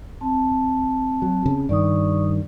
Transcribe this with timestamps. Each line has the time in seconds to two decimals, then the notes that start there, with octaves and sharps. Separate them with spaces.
0.21 C4 A5
1.22 F#3
1.46 C#3
1.69 G2 D#3 D5 C#6 D#6